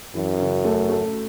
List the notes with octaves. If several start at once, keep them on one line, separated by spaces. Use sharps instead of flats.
F#2 E3
C#3
A3
A3